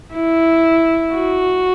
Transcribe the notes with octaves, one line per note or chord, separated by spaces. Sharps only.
E4
F#4